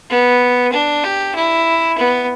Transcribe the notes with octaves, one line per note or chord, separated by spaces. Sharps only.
B3
D4
G4
E4
B3